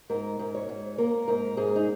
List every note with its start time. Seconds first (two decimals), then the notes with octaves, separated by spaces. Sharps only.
0.10 G#2 A#4
0.39 G#2
0.55 C#5
0.69 G#2
0.98 A#3 A#4
1.28 G#2 A#4
1.57 G#2 G#4
1.76 D#4